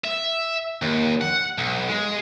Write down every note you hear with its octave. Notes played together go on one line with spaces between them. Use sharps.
E5
D#2
F#5
B1
G#3